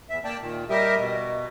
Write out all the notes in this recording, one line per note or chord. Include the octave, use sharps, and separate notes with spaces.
E2 E5
A#3 D5 G5 A5
A#2 D#3
G3 G4 A#4 D#5 E5
B2